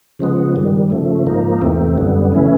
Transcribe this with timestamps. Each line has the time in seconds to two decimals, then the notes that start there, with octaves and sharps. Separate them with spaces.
0.19 C#3 F3 G#3 B3
0.56 G2 D#3 G3
0.90 C#3 F3 A3
1.26 G#2 F3 A#3 D#4
1.61 E2 C3 E3 A3 C4
1.98 F#2 D3 G3 B3
2.32 C#3 E3 A3 C#4 E4